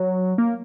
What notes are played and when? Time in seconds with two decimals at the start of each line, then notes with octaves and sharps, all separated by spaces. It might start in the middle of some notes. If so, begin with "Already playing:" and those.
Already playing: F#3
0.38 A#3